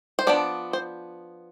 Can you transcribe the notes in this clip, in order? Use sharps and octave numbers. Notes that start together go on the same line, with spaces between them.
C5
F3 B3 D4 D5
C5